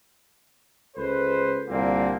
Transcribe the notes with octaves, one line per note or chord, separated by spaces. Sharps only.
C#2 A4 B4 C5
C2 A#2 D3 A#3 C4